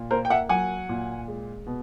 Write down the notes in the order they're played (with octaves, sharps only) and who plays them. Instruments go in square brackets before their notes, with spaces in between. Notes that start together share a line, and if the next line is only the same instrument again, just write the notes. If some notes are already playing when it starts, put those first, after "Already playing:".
Already playing: [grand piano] A#2
A#3 A#4 C5
G5
E5 F#5
F#3 F#5 G#5
A#2
G#3
B2